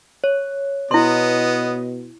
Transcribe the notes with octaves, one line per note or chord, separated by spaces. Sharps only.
C#5
B2 B3 E4 D#5 C6